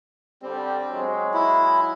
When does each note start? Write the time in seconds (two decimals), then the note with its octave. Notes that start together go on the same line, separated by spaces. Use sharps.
0.42 D3 G3 C4
0.91 F#3 G#3
1.34 E4